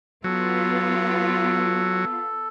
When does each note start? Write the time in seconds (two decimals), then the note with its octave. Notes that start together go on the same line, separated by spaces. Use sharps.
0.24 F#3 B3 F4 A4